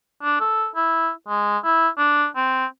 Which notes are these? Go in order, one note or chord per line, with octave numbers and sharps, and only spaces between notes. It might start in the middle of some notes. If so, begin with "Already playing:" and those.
D4
A4
E4
G#3
E4
D4
C4